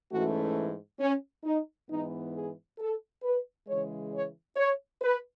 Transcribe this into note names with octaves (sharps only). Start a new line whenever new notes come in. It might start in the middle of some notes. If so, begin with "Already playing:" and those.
G#2 E3 A3 C#4 F#4
C#4
D#4
G#2 E3 B3 D#4
G#4
A4
B4
C#3 E3 G#3 C#5
C#5
C#5
B4